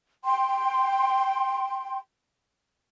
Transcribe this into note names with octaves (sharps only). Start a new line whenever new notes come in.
G5 C6